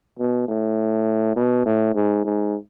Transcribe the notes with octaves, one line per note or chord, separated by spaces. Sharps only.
B2
A2
B2
A2
G#2
G#2